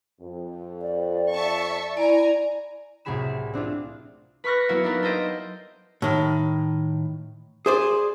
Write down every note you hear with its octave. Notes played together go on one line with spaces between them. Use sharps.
F2
D5
E5 A5 C#6
E4 D5 G#5 A#5
C2 A2 F#3 G#4 B5 E7
C4 D4 E4 F4
B4 B5 C#6 F6 F#6 A#6
F#3 A#3 B3 E4 F#4
D4 D#4 A#4 B4
A4 A#4 C5 D#5 G5
A2 D#3
G#4 C5 D5